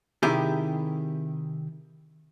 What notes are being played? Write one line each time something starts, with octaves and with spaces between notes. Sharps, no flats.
C3 D#3 E4 G4 G#4